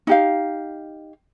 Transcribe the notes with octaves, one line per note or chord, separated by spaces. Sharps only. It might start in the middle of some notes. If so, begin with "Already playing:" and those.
D#4 G4 F5